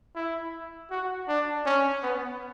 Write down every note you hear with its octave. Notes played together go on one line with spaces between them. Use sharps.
E4
F#4
D4
C#4
B3